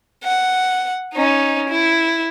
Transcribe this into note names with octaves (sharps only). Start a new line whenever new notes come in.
F#5
C#4 D#4
E4